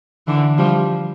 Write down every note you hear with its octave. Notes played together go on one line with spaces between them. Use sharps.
D3 E3
F3 G3